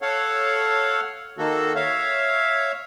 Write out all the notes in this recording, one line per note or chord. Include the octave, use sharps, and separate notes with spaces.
A4 C#5 F5 F#5
D#3 A#3 F#4 A4
C#5 E5 F5